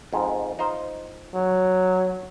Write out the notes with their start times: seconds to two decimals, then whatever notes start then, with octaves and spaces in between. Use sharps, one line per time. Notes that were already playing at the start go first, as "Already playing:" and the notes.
0.13 F2 G#2
0.59 D#4 F4 C5
1.35 F#3